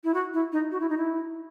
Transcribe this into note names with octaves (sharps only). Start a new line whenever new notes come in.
E4
F#4
E4
D#4
F#4
E4
D#4
E4